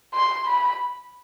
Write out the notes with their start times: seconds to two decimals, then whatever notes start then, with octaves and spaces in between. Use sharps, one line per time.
0.13 C6
0.46 B5